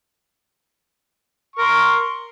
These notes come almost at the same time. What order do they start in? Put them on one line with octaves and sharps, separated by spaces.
C#6 A#4 C6